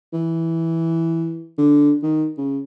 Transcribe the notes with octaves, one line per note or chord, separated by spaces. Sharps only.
E3
D3
D#3
C#3